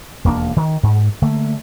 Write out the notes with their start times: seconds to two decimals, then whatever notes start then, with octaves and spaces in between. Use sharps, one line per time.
0.25 E1 D#2 A#3 D4
0.56 D#3
0.83 G#2
1.22 D3 A3 A#3